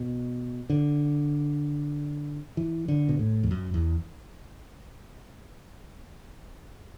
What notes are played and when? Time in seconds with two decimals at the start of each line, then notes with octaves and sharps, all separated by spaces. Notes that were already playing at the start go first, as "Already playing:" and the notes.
Already playing: B2
0.70 D3
2.57 E3
2.88 D3
3.09 B2
3.19 A2
3.43 E2
3.51 F#2
3.74 E2